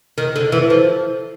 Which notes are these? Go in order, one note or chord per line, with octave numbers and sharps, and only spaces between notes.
D#3
D3
E3
F3